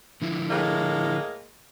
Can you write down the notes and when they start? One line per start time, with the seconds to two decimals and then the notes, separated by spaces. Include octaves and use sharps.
0.22 D3 F3 E4
0.50 A2 G#3 A#3